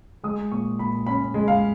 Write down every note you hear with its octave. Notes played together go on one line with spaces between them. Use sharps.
G#3 D#6
A#2 C#6
A#2 B5
C#4 B5
G#3
F5